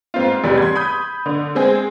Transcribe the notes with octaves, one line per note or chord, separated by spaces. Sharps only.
G#2 C4 F4
A1 E2 C3 G3
C6 G#6
B5 D#6 G6
D3
G#3 C4 G#4